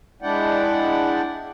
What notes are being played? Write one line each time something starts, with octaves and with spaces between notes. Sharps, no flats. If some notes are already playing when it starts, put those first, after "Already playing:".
G#3 D4 E4 D5 F#5 G5